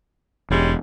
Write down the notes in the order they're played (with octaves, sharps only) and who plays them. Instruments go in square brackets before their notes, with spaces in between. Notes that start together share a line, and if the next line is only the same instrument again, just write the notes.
[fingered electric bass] E1 [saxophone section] G3 G#3 C#4